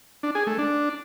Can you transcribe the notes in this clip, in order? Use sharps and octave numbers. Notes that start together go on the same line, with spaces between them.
D4
G#4
A3
D4